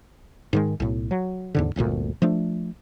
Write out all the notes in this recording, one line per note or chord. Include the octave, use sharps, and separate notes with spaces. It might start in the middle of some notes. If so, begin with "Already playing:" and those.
G#2 D#3 G#3
B1 A2
F#3
D#2 G#2 D3
D1 G1 D2 A#2
F3 A3 D4